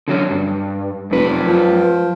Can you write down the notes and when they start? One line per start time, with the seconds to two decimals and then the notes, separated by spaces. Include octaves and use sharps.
0.08 D3 F#3 C#4
0.31 G2
1.11 F1 F#2 B4
1.47 F3